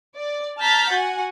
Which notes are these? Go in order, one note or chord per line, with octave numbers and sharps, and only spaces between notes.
D5
A5 A#5 F6 G6 A6 B6
F#4 F#5 G#5